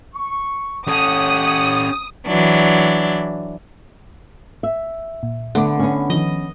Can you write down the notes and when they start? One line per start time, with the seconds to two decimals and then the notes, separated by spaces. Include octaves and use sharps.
0.14 C#6
0.88 C#4 G4 A4 C#5 F#5 D#6
2.27 E3 F#3 D4
4.63 E5
5.23 A#2
5.55 D3 A3 B3 F#5 D6
5.79 B3 C#4
6.10 D#3 F3 D#5